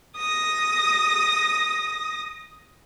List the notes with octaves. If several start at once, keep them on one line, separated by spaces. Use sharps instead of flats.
D#6 A#6